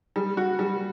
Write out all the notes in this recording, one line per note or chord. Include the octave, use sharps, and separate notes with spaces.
G3
F#4
G3